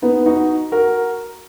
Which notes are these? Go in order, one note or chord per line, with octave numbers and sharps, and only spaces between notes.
B3 D#4
D#4 F#4
F#4 A#4